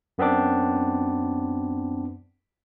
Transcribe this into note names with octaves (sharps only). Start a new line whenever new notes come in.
F#2 B3 C4 D4 D6